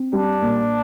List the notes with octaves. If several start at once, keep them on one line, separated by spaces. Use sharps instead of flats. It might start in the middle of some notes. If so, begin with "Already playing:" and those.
Already playing: C4
G3 D4
A#2